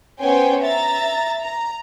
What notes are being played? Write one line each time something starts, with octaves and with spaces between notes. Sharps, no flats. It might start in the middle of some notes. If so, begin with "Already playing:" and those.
B3 C#4 C5 G5 G#5
E5 A#5 A6
A#5